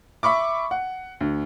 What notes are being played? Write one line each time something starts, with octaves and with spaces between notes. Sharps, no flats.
E5 B5 C#6 D6
F#5
D2